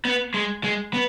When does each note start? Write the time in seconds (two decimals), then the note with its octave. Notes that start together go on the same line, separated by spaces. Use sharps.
0.05 B3
0.34 G#3
0.64 G#3
0.93 B3